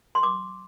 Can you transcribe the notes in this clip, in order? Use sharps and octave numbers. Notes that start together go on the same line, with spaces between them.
C6
D6